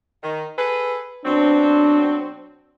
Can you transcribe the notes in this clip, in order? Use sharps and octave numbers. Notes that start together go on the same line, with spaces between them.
D#3
G#4 A4 B4
B2 F#3 C4 D4